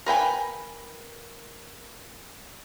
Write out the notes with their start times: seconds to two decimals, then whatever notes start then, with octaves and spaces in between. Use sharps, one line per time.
0.06 A#4 B4 G5 G#5